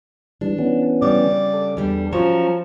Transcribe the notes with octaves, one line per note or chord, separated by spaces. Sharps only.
E3 G3 D4
E3 B3 C#4
C#3 G3 D5
A4
E2 G3 D4
F3 F#3 C#4 A5 A#5 C#6